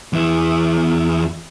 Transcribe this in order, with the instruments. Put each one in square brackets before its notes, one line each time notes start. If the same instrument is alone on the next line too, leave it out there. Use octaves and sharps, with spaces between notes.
[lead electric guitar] E2 E4